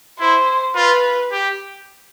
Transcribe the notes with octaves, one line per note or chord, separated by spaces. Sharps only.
E4 C5
F4 B4
G4